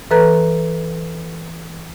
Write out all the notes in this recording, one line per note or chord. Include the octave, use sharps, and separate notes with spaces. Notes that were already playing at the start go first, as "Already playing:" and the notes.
E3 A4 B4 A#5 F#6